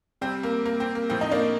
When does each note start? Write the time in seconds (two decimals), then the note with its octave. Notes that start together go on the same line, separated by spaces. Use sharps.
0.21 C3 G3 C4
0.43 A#3
0.66 A#3
0.80 C4
0.95 A#3
1.10 A2 F3 C4
1.21 D#4
1.31 A#3 D4